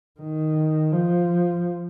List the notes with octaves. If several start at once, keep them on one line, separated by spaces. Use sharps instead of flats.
D#3
F3